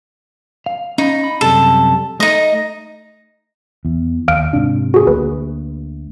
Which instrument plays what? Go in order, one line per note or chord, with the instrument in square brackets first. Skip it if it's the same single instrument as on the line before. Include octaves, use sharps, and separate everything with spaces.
[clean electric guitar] F5
[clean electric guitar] C#4 F5 B5 [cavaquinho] D#4
[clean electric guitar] B5
[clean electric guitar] F#2 C3 G3 [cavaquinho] A4
[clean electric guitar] A3 [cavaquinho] D#4 D#5
[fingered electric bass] E2
[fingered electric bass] D#2 [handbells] F5 F6 D7
[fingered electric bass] G#2 C3 [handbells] D4
[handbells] F#4 G#4
[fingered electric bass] D2 A#3 [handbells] B4